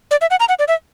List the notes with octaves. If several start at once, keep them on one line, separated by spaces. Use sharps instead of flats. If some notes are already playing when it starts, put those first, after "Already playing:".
D5
E5
F#5
A#5
F#5
D5
E5